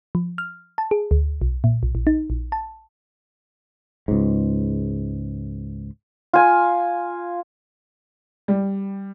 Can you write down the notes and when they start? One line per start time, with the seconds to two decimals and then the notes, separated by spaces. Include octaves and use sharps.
0.15 F3
0.38 F6
0.78 A5
0.91 G#4
1.11 D2
1.42 B1
1.64 A#2
1.83 B1
1.95 A#1
2.07 D#4
2.30 A#1
2.52 A5
4.08 C#2 G#2
6.33 F4 G#5
8.48 G3